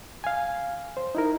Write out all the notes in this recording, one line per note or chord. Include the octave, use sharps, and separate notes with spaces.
F5 G#5
C5
D#4 E4 A#4